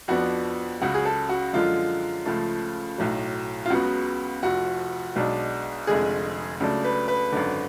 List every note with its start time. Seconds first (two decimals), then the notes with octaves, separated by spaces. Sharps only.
0.08 F2 F3 B3 D4 F#4
0.81 C#2 C#3 F#3 F#4
0.94 G#4
1.05 A4
1.29 F#4
1.53 F#2 D3 F3 G#3 F4
2.26 C#2 C#3 F3 A3
2.98 B1 A2 F#3
3.66 F4
3.70 C#2 C#3 F#3 B3 F#4
4.43 F1 F2 F3 F#4
5.16 B1 B2 G#3 D4
5.87 F1 F2 D3 G#3 G#4
6.60 C#2 C#3 F#3 A3 D4
6.84 B4
7.08 B4
7.32 G#1 F#2 D3